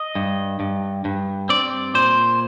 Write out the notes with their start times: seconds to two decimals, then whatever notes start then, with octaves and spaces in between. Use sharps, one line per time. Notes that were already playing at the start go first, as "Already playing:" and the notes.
Already playing: D#5
0.15 G2
0.60 G2
1.05 G2
1.49 C4 D5
1.94 A#2 C5